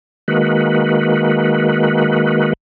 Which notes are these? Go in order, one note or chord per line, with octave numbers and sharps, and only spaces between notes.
D#3 G#3 A#3 F#4 B4